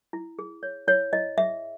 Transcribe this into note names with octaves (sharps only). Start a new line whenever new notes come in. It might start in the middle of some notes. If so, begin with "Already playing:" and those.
E4
G#4
C#5
E4 C#5
E4 D#5
G#4 E5